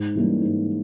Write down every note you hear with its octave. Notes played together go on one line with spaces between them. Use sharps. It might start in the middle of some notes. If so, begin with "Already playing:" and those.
Already playing: G#2
E3 G3 A#3 C#4
G#2